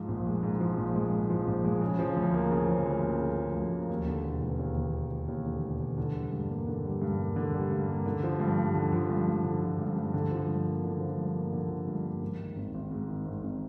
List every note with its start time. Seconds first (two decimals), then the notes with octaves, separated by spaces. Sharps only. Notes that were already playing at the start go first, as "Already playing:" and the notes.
Already playing: G#2 F3
0.08 A#1
0.26 G#3
0.43 G#2
0.60 F3
0.77 A#1
0.95 G#3
1.13 G#2
1.30 F3
1.47 A#1
1.65 G#3
1.81 C#3
1.99 F3
2.16 D2
2.34 A#3
2.51 C#3
2.68 F3
2.86 D2
3.03 A#3
3.20 C#3
3.38 F3
3.55 D2
3.72 A#3
3.89 D#2
4.07 D3
4.24 E1
4.41 E1
4.59 D#2
4.77 D3
4.93 E1
5.11 E1
5.28 D#2
5.46 D3
5.63 E1
5.80 E1
5.98 D3
6.15 G3
6.32 G2
6.49 A#3
6.67 D3
6.84 G3
7.02 G2
7.19 A#3
7.36 D3
7.54 G3
7.71 G2
7.89 A#3
8.06 D3
8.23 F3
8.40 G2
8.58 G2
8.75 D3
8.92 F3
9.10 G2
9.27 G2
9.44 D3
9.62 F3
9.80 G2
9.96 G2
10.14 D3
10.31 F3
10.48 G2
10.66 A#3
10.84 D3
11.01 F3
11.18 G2
11.35 A#3
11.53 D3
11.70 F3
11.87 G2
12.04 A#3
12.22 G#2
12.39 D#3
12.56 G#1
12.74 G#1
12.91 G#2
13.09 D#3
13.26 G#1
13.43 G#1